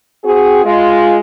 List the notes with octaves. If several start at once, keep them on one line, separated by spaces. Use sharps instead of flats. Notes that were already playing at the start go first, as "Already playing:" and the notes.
C4 F#4 G#4
G#3 F4